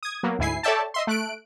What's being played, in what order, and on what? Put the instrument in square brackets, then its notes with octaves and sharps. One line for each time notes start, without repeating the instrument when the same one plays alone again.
[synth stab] D#6 G#6
F#3 A#3 B3
D2 G#2 E4 G#5 C7
A4 C#5 D5 E5 G5 A5
D#5 E5 C6
A3 F#6 D7